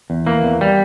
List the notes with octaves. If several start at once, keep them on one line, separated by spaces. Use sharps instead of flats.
E2
E3 A#3
E2
G3